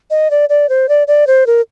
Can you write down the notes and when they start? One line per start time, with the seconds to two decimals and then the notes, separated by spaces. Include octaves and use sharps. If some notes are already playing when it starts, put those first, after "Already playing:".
0.10 D#5
0.31 D5
0.49 D5
0.69 C5
0.89 D5
1.07 D5
1.27 C5
1.47 A#4